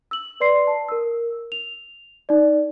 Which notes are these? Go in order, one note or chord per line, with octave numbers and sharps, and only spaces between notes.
E6 F#7
B4 D5 C6 C7
A5
A#4 E6
F7
D#4 D5